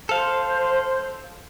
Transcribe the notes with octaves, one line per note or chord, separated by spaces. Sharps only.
A4 C5 F5